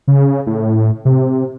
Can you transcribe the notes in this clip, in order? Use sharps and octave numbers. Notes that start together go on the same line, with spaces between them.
C#3
A2
C3